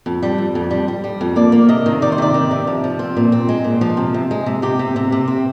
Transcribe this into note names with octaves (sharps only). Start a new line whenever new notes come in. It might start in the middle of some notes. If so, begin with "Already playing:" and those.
F2
G3
F2
F2
G3
G3
G3
F2
A#3 D5
A#3
C3 D#5
D#3
D#3 D5
C5
C3 D5
D#3
C3
F3
F3
C4
A#2
C4
G#3
A#2
F3
C3
C3
G#3
C3
C3 G4
C3
C3
C3
C4